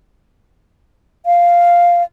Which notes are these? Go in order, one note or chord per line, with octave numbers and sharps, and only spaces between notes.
F5